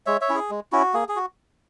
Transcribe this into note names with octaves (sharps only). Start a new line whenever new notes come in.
G#3 C#5 E5
C#5 E5
C#4 E4
G#4
G#3
C#4 E4 F#4
A#3 G#4
G#4
F#4